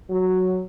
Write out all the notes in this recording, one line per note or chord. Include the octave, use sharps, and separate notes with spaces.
F#3